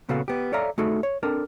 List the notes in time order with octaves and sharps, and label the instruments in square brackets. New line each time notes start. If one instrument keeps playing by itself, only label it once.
[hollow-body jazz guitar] A#2 C#3 B3 F#4 A4 F5
B3 G4
A4 C#5 D5 E5 F5 A#5
A3 D#4 F#4 G#4 A4
C#5
C4 D4 A4 A#4